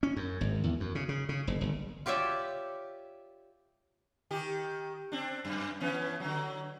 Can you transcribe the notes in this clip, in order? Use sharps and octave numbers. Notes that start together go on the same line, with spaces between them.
C#4
F#2
G#1
E2
F#2
C#3
C#3
C#3
F#1
G1
F4 G4 C#5 D5 E5
D#3 G4
C4 D4
F#2
E3 B3 C#4
D3 F#3